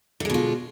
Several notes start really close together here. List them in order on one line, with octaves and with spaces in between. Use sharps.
D3 G#3 B2 F4